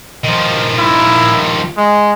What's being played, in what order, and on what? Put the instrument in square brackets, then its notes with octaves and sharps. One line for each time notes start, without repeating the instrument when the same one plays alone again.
[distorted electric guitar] D#3 F3
[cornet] E4
G#3